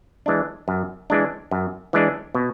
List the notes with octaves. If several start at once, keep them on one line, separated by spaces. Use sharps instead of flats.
E3 G#3 D4
F#2
E3 G#3 D4
F#2
E3 G#3 D4
B2